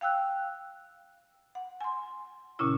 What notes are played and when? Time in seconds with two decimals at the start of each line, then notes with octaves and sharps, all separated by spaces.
0.01 F5 G5 E6 F#6
1.55 F#5
1.81 G#5 C6
2.59 A#2 C#3 C#4 E4